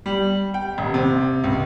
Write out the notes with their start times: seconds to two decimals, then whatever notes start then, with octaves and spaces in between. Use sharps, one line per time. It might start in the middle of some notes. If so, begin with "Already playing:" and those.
0.06 G3
0.54 G5
0.78 D#1
0.94 C3
1.44 C#2